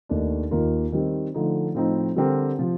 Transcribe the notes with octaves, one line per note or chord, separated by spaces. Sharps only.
D#2 D#3 A3 D4
D#2 D#3 A#3 F4 A#4
D#3 G3 C4
D3 F3 A3 D#4
A2 F3 C4 D#4
D3 G3 C4 G4 A#4
C3 F3